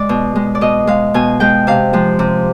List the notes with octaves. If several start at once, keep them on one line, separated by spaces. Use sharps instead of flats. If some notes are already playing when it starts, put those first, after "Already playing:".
Already playing: G#3 D5
B2
G#3
D5
B2 D#5
G#3 F5
B2 G#5
G#3 G5
C3 F5
F3 G#3
C3